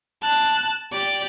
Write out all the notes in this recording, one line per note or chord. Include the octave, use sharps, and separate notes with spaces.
A5 F#6
G4 D5